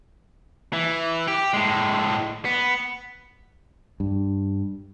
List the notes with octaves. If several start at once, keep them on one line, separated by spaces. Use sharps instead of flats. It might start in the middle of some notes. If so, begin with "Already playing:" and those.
E3
G4
A2 G#3
B3
G2